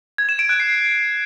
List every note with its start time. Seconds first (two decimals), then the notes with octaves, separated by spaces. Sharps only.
0.18 G#6
0.29 E7
0.39 D7
0.49 F#6
0.60 C7